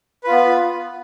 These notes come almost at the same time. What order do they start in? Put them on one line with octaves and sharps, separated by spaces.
B4 F4 B3